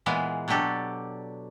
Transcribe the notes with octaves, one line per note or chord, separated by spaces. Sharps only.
A#2 E3 G#3 B3 F5
B2 F#3 D4 G4 A4 D5